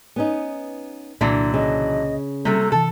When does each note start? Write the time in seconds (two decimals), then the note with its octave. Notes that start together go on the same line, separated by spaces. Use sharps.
0.16 B3 C#4 D#4
1.21 C2 A#2 D3 E3 F#3 A#3 D4
1.54 C#3 D#5
2.45 C3 F#3 G3 A3 A#3 A4
2.72 C3 E3 A4 A5